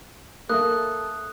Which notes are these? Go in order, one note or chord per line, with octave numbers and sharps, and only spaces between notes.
A#3 A4 E5 D#6 F#6